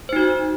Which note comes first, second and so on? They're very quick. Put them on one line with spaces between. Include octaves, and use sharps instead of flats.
C5 D#4 F#4